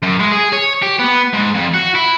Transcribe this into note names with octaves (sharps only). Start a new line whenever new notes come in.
F#2
G#3
G#4
C#5
G4
B3
G#2
F2
F#4
E4